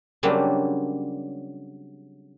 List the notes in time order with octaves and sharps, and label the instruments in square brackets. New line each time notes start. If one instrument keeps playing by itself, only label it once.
[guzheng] C#3 F#3 G3 A#3 C4 D4